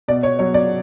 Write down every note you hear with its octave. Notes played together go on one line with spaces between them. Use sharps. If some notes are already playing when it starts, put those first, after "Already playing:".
B2 D5
C#5
F#3 C#5
D5